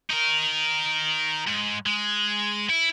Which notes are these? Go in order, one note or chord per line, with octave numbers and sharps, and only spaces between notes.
D#4 A#4
G#2
G#3
E4